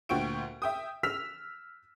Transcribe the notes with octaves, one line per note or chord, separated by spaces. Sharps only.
D2 A#2 F#4 G5 C#6 D7
E5 G5 D#6
E6 F6 B6 F7